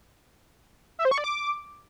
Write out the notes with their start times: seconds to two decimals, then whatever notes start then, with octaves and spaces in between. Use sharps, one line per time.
0.99 E5
1.05 C5
1.11 C#6
1.18 D5
1.24 D6